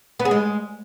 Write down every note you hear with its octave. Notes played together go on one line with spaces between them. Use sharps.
B3
G#4
G#3